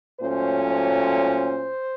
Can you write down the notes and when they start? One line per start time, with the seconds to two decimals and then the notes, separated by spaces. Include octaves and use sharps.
0.20 A#2 F#3 A3 C#4 C5
0.67 C5